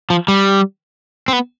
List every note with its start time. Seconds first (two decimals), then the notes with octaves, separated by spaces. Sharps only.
0.10 F3
0.28 G3
1.28 C4
1.33 B3